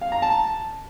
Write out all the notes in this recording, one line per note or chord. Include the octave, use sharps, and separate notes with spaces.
F5
A#5
A5